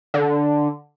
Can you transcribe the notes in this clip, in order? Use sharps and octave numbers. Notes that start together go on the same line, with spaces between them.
D3